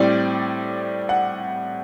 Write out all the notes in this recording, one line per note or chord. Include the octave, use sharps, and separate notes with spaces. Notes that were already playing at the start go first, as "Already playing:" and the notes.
Already playing: A2 G3 C4 D5
F#5